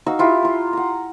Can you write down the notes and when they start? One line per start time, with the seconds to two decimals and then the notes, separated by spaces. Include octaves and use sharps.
0.06 D#4 F#4 F5 E6
0.19 E4 F4 G4
0.43 F4 A#5
0.73 F#5 A#5